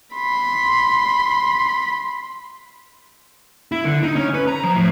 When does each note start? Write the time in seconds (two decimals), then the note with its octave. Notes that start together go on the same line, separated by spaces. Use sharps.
0.16 B5 C6
3.72 E4
3.85 D3
4.03 D#4
4.16 C#4
4.34 B4
4.48 A#5
4.64 F3
4.76 A2